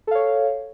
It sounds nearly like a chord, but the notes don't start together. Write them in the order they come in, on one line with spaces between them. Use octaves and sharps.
A4 F5 C#5